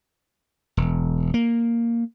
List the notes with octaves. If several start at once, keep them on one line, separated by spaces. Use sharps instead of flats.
E1
A#3